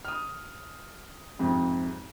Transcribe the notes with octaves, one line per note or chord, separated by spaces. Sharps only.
D#6 F6
F2 G#2 C3